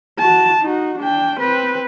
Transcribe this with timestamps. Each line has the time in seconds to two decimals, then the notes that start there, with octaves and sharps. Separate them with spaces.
0.19 F#4 A5
0.62 D#4 F#4
0.99 D4 G5
1.40 C4 B4